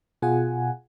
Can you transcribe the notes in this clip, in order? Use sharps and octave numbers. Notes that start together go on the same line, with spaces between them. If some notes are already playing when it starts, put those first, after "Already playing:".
B2 F4 G#4 F#5 G#5